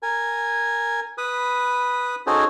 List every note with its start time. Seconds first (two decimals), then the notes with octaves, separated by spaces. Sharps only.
0.03 A#4 G#5
1.18 B4 B5 D#6
2.27 C#4 D#4 F#4 G#4 A4 C5